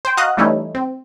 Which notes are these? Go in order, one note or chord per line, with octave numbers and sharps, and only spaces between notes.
C5 G5
F#4 D#5 F5 A#5 D#6 F#6
E3 G3 A3 C#4 D#4 E4
C4